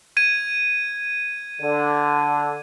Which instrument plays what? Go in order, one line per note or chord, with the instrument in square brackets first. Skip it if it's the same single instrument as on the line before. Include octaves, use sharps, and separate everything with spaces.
[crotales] G#6 D#7
[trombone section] D3